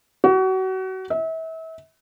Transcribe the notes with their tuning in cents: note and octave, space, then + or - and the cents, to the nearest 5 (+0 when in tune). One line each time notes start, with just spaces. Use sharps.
F#4 +30
E5 -35